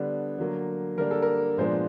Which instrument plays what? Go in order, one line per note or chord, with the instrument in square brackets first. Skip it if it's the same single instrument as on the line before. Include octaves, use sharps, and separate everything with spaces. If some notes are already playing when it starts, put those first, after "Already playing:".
Already playing: [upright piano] D3 G3 B3 D4
D3 F#3 A#3
D3 G3 A#3 D4 A#4
A4
A#4
A#2 F3 G#3 B3 D4 C5